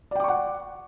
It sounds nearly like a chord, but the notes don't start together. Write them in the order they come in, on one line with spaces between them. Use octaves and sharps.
D5 G5 D6 C#6 F#5